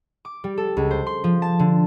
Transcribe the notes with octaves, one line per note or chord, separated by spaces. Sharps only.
D6
G3
A4
C#2
C5
C6
F3
A5
D3